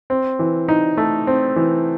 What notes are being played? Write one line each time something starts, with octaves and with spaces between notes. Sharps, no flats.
C4
E3
D#4
A3
C4
E3